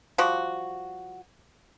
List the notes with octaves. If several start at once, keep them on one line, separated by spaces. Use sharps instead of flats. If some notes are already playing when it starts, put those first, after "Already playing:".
F3 G3 F#4